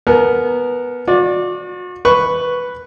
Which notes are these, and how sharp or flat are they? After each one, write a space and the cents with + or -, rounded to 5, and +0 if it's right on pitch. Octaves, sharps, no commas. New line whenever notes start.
B3 -5 A#4 +0 A5 -45
F#4 -40 D5 +0
B4 +0 C#6 +0